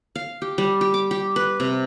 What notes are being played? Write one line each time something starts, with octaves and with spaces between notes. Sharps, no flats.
F5
G4
G3
G4
D6
G4
B4
C3